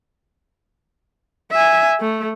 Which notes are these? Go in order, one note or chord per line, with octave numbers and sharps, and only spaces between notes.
E5 G#5
A3